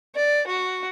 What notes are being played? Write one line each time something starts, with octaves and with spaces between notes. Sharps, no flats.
D5
F#4